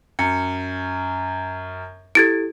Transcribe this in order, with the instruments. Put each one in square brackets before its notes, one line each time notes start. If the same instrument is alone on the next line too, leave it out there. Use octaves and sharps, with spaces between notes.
[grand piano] F#2 [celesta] C#7
[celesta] E4 G4 A4 [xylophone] G#6 A6 D7